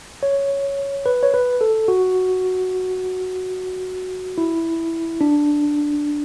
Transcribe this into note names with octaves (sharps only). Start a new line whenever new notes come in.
C#5
B4
C#5
B4
A4
F#4
E4
D4